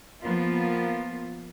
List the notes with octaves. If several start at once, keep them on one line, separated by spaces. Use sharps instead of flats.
F3 A#3 B3 F4